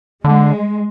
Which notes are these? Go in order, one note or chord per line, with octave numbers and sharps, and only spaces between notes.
D3 G#3